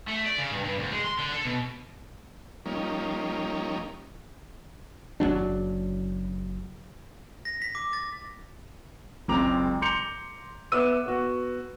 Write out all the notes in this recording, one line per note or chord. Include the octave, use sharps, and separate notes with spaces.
A3
D5
C#3
G2
G2
D2
G#3
C6
D3
A4
B2
F3 G3 A#3 C#4 D#4
F#1 F2 F#3 D4
A#6
B6
D6
A6
F#1 C#2 C4 A#5 D6 F7
A#5 C6 D6 G6 C#7 F7
B3 E5 D6 E6 D#7
B3 F#4